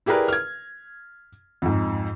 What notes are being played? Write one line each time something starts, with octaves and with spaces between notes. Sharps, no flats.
E4 G4 G#4 A#4 B4 D5
F6 G#6
F2 G#2